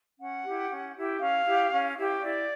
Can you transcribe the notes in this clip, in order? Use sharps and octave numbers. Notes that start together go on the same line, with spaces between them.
C#4 F#5
E4 G4
C#4
E4 G4
C#4 F5
E4 G4
C#4
E4 G4
E4 D5